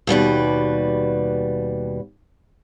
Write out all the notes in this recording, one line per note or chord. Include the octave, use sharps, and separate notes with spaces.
D#2 B2 G3 B4